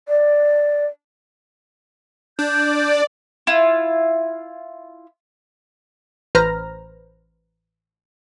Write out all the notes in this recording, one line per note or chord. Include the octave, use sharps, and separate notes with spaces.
D5
D4 D5 G6
E4 F4
A1 B4 C5 A#5 F6 A#6